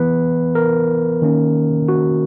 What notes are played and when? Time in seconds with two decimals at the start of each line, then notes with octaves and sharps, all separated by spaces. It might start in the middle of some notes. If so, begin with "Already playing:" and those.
Already playing: E3 B3 B4
0.55 A#4
1.22 D#3 A#3 C#4
1.88 F#4